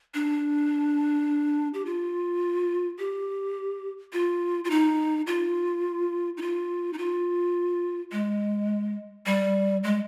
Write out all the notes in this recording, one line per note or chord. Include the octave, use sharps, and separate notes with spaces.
D4
G4
F4
G4
F4
F4
D#4
F4
D#4
F4
D#4
F4
G#3
G3
G#3